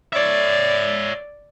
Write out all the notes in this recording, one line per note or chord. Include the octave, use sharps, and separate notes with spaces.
C#5 D5 E5